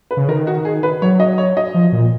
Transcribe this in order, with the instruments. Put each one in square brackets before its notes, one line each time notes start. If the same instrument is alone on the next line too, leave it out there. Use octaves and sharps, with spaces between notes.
[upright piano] B4
[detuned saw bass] C#3
[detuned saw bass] D#3 [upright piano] A#4
[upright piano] F#4
G#4
B4
[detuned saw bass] F#3 [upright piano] C#5
[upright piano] D#5
C#5
D#5
[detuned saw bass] F3
A#2